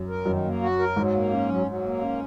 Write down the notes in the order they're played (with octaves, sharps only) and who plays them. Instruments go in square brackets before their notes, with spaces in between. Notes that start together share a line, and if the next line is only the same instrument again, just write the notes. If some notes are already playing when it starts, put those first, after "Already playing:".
Already playing: [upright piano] F#2
[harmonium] A#4
[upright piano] F#2 [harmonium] D#3
[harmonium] A#3
F#4
A#4
[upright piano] G#2 [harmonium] F#3
[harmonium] A#3
C#4
F#3
F#3
A#3
C#4